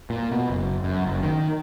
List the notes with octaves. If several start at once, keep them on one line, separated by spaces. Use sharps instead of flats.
A#2
B2
F#1
F#2
F#1
D#3